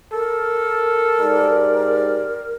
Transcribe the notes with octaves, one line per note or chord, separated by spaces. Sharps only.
A4 A#4
G#2 G4 D5